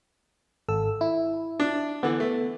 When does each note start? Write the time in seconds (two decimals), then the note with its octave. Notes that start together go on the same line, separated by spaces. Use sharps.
0.68 G#1 A4 E6
1.01 E4
1.60 D4
2.03 D3 E3 B3
2.20 A3